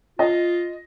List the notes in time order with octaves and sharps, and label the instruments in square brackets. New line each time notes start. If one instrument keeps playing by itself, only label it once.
[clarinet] F4 [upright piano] D#5